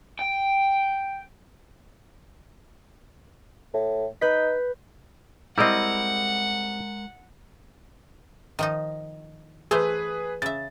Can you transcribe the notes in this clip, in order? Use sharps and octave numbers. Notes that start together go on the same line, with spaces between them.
G5
A2
D#4 B4 G6 B6
G3 G#3 C4 E4 A#4 D#5 F#5
D#3 F3 D#4
E3 A3 G#4 B4 C5
C#3 E5 A6